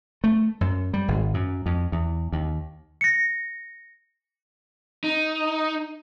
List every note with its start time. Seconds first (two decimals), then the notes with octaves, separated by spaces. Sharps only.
0.24 A3
0.61 F#2
0.94 G3
1.08 G#1
1.34 F#2
1.66 F2
1.92 E2
2.33 D#2
3.01 A#6 C#7
5.04 D#4